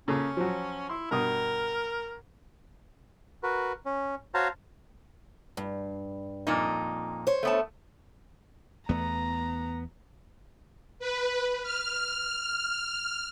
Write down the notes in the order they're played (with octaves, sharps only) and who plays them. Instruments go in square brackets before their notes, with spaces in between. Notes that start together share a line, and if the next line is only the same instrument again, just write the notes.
[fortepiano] C#3 A#3 A4 [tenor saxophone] C#4
[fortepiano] F3 F#3
[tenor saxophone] E4 [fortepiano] C6
[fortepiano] G2 B2 D#6 [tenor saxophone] A#4
[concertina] F#4 A#4 B4
C#4
F#4 C5 C#5 F5 A5 A#5
[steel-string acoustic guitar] G2
[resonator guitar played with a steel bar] F2 A#2 D#4
[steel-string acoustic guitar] C5 C#5
[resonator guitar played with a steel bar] A3 B3 A5
[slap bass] E2 A3 [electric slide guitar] B3 [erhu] A#5
[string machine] B4
F6